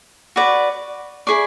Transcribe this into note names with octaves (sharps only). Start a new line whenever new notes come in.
F#4 B4 D5
E4 G#4 D5 C#6